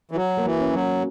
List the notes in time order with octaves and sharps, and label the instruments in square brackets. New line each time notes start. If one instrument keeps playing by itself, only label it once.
[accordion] E3
[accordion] F#3 [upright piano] F#4
[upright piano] A#3
[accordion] E3
[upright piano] C#4
[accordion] F#3
[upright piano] F#4